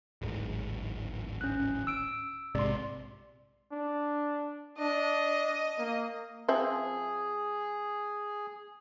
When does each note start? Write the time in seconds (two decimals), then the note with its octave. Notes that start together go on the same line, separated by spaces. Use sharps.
0.22 D1 G#1
1.41 C#4 F#6
1.87 E6 D7
2.55 A#1 G#2 C3 D5 C6
3.72 D4
4.79 D4 D#5
5.79 A#3
6.48 F3 C4 G#4 E5